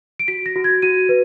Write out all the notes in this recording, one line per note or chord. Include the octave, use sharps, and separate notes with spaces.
D7
F#4 B6
A#6
F#4
G#6
F#4 D#7
B4